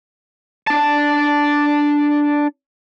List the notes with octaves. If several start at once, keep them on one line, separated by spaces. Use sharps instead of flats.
D4 A5